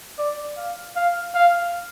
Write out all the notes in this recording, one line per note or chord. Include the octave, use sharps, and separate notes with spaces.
D5
F5
F5
F5